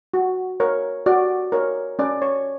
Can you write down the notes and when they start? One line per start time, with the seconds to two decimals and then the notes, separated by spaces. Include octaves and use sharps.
0.14 F#4
0.60 A#4 C#5
1.06 F#4 D5
1.52 A#4 C#5
1.99 C#4 D5
2.22 C#5